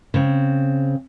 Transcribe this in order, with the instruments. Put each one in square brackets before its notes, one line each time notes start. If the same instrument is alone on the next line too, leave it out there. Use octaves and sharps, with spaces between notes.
[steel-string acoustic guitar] C#3 C4